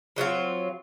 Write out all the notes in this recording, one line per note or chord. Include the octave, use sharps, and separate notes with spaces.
F3 F#3 C4 F4